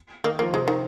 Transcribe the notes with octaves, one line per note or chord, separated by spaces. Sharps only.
D#3 A#3 D#4
F3 A#3 F4
C3 G#3 C4
D#3